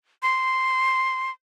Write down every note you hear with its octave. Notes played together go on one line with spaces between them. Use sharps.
C6